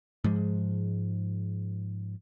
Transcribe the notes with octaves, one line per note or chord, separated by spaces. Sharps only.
G#2 F3 G#3